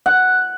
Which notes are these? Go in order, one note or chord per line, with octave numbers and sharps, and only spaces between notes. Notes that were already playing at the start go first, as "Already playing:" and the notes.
F#5